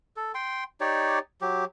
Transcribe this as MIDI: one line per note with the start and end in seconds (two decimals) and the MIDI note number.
0.17 0.32 69
0.35 0.64 79
0.35 0.64 84
0.81 1.19 63
0.81 1.19 67
0.81 1.19 73
0.81 1.19 74
1.41 1.65 54
1.41 1.65 67